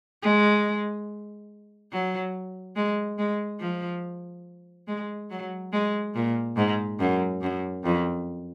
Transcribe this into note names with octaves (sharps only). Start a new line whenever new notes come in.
G#3
F#3
G#3
G#3
F3
G#3
F#3
G#3
A#2
G#2
F#2
F#2
F2